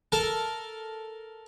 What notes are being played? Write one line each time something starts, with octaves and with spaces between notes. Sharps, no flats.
A4 A#4